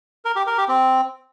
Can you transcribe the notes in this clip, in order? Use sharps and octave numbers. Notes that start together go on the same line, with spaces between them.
A#4
G4
A#4
G4
C4